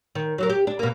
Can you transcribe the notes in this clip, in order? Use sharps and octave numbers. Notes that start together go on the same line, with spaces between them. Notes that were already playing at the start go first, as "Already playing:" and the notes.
D#3
F#3 F#4 A#4
G4
D4
B2 A#3